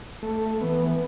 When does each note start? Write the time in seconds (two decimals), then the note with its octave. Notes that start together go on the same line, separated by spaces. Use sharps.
0.23 A3
0.61 E3 B3